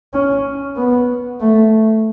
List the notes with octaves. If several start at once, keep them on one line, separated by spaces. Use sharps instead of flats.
C#4
B3
A3